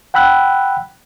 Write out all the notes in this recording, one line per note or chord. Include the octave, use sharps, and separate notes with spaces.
F#5 G5 B5 E6 F#6